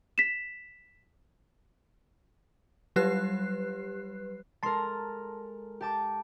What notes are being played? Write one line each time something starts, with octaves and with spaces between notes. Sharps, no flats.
B6 E7
F#3 G3 G4 B4 F#6 C7
G#3 A4 A#4 A5 C6
G4 A5 D6